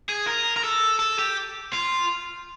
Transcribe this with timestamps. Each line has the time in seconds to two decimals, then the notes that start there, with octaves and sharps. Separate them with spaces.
0.09 G#4
0.27 A#4
0.57 A#4
0.64 A4
1.00 A4
1.19 G4
1.73 F4